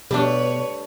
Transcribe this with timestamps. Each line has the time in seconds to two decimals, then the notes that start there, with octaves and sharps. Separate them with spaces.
0.11 B2 G3 A3 D4 G4 B4 C#5